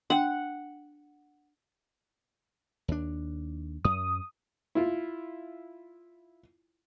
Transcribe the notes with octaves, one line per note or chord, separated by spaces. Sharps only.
D4 F#5 G5
D#2 D4
F#2 D#6
E4 F4